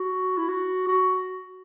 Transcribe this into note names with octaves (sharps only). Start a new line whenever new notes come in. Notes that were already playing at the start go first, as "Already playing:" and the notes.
Already playing: F#4
E4
F#4
F#4